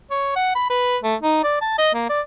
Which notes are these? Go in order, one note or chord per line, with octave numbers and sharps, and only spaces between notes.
C#5
F#5
B5
B4
A3
D#4
D5
A5
D#5
A#3
D5